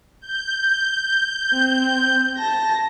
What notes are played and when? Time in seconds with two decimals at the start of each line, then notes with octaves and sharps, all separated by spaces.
0.20 G6
1.53 C4
2.37 A5 A#6